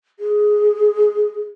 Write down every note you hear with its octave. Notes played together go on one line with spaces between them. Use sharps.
G#4